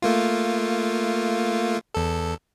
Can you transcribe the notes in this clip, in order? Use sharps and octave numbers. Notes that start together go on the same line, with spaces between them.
A3 A#3 F4
E2 A4